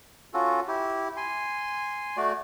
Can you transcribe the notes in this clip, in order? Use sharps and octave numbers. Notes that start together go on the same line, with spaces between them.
C#4 F4 F#4 A4
E4 G4
G#5 C6
A3 F#4 D5